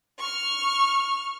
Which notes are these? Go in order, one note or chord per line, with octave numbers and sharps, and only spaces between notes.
C#6 F6